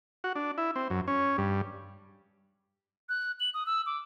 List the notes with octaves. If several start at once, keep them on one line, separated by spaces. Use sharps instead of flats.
F#4
D4
E4
C4
F#2
C#4
G2
F#6
F#7
D#6
E6
D6